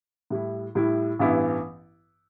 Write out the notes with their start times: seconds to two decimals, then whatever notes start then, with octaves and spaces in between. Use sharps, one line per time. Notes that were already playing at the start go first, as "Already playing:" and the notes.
0.30 A2 G3 E4
0.75 A2 G3 E4
1.19 A1 G2 E3 B3 E4